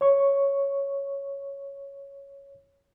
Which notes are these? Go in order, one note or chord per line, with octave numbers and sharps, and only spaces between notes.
C#5 C#6